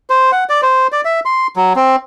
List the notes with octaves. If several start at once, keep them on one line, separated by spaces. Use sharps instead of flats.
C5
F#5
D5
C5
D5
E5
C6
F#3
C4